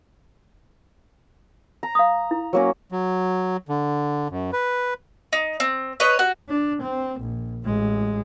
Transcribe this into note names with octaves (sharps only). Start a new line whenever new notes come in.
A#5
F5 D#6
E4
F#3 A#3 C#4
F#3
D3
F#2
B4
D#4
C4
B4 C#5 D#5
F#4
D4
C4
A#1
A1 G#3